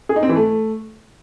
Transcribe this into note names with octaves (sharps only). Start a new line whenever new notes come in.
G#4
D#4
C4
E3
A3